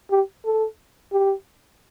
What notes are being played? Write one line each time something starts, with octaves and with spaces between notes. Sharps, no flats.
G4
A4
G4